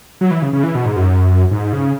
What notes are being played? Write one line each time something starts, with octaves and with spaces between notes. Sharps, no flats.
F#3
E3
C#3
C#3
E3
B2
G#2
F#2
G#2
C#3